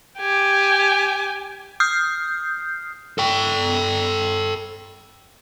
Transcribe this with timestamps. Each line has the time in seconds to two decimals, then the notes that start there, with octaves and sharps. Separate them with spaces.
0.19 G4 G#5
1.80 D#6 F6 G6 C7
3.18 A4 G5